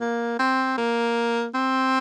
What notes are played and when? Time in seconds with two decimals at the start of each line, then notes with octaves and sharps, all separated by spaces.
0.01 A#3
0.39 C4
0.78 A#3
1.54 C4